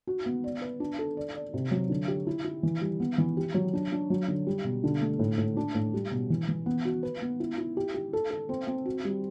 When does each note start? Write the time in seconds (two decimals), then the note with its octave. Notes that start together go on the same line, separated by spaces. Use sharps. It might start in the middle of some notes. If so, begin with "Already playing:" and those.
0.07 F#4
0.26 B3
0.44 D5
0.62 B4
0.80 D4
0.99 A4
1.17 D5
1.35 D5
1.54 C3
1.71 F#3
1.90 D3
2.08 G4
2.27 E4
2.44 E4
2.63 E3
2.81 G3
3.00 B3
3.18 E3
3.37 G4
3.54 F#3
3.73 D4
3.92 D4
4.10 F#3
4.28 D3
4.47 G3
4.64 B2
4.84 D3
5.01 A3
5.19 A2
5.38 A2
5.57 D4
5.75 A2
5.94 G3
6.11 B2
6.30 E3
6.49 E3
6.66 B3
6.85 F#4
7.03 B4
7.22 B3
7.40 E4
7.58 E4
7.77 G4
7.94 G4
8.13 A4
8.31 A4
8.49 C4
8.67 C4
8.86 F#4
9.05 G3